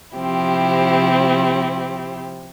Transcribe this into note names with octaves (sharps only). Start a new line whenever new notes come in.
C3 F3 C4 E4 G4